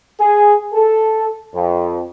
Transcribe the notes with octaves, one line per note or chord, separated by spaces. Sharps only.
G#4
A4
F2